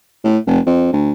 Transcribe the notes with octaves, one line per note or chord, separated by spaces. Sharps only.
A2
F1
F2
D2